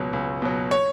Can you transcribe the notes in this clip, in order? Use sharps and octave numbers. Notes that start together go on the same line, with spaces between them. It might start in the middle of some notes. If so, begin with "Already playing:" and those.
Already playing: C#2 B2 F#3
C#2
B2 F#3
C#5